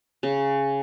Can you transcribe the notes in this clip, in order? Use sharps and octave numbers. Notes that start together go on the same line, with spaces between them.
C#3